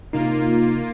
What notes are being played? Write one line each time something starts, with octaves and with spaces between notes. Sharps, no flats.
C3 A#3 D#4 F4